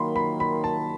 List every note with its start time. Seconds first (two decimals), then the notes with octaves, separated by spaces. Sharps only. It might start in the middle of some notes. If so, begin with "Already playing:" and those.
Already playing: D#3 F#3 A#3 B5 C6
0.16 B5
0.40 B5
0.64 A5